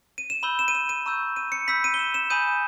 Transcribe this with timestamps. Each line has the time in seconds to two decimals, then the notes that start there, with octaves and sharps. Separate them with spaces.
0.18 D#7
0.30 E7
0.43 B5 E6 G6 G7
0.59 E7
0.68 D#7
0.75 E7
0.89 D#7
1.06 A#5 C#6 E6 G6
1.36 D#7
1.52 C#7
1.67 B5 E6 G6 B6
1.84 D#7
1.94 G7
1.99 E7
2.14 E7
2.30 G#5 B5 D#6 G6 D#7